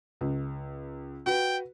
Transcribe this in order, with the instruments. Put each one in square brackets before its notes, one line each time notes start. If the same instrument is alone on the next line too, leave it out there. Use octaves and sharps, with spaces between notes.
[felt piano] C#2
[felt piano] F#4 B4 [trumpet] G5